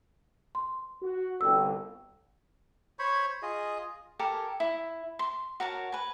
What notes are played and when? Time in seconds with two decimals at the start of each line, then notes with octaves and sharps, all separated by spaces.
0.55 C6
1.02 F#4
1.41 G1 C2 G5 E6
2.99 C5 C#5 B5 C#6
3.42 F4 G#4 D#5
4.19 G4 A4 A#4 G#5
4.60 E4
5.19 C6
5.60 F#4 A#4 C#5 A5
5.92 B4 G#5